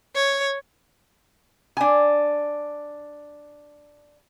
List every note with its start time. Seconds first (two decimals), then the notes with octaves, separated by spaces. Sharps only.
0.15 C#5
1.77 D4 G#5